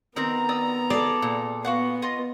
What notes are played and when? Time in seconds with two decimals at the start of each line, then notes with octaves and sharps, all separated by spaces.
0.16 D#3 B3 C4 A#4 A#5
0.49 D5 D#6 E6
0.90 G#4 A4 D5
1.22 A#2
1.65 B3 F#4 F5 F#5
2.02 F4 D#5